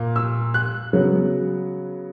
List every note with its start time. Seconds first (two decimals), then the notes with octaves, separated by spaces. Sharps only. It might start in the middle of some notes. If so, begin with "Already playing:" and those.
Already playing: A#2 A#3
0.16 E6
0.54 F#6
0.93 C#3 F#3 B3